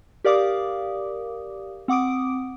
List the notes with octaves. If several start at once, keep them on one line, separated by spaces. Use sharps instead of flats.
G4 A#4 D5 F5 D6 D#6
C4 F#5 D6 D#6 D7